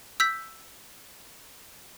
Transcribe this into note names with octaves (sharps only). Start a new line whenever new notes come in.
E6 G6 B6